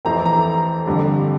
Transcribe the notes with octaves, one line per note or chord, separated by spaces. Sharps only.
F2 E3 A3 C4 A#5
A#5
G1 F2 D3 G3